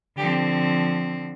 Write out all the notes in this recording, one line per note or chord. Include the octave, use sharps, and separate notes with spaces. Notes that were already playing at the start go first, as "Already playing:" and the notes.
D3 F3 C4 G4